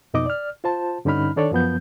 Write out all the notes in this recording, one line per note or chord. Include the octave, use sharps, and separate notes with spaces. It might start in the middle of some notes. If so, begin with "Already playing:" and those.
F2 B2 D#4 D#5 D6 D#6
D5 F6
F4 C5 A5
G2 D3 C#4 D#4 B5 F6
D#3 D4 A4 C#5 D5
F#2 F3 B3 G6